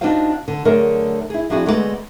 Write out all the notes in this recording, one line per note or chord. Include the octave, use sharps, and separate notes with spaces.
D4 D#4 F4 F#4 C5 F5
D3
D3 F#3 A3 G#4 A#4
E4 G#4
F3 C4 D4 E4 F#4 G#4
D2 G#3 A3 B3 A4 D5